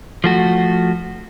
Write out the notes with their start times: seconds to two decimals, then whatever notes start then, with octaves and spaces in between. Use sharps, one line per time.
0.24 F3 A3 F#4